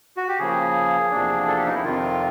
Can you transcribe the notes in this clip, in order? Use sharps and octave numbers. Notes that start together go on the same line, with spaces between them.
F#4
G4
C#3 F3 A#3 G#4
E2 C3 F3 A#3 D4
A4
G4
D#4
E4
F2 C3 D#3 F4